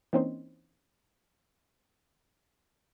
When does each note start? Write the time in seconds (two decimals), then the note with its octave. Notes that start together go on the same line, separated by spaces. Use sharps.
0.13 E3 A#3 C4 C#4 D#4 C5